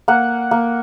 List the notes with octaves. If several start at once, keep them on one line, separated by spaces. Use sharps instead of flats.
A#3 F#5
A#3